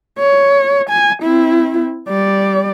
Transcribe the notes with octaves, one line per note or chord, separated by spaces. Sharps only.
C#5
G#5
C4 E4
G3 D5